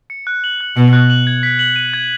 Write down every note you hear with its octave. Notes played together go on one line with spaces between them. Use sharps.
C#7
F#6
F#7
F#6
B2 C#7
F#6
F#7
G#6
B6
F#7
D#7
G#6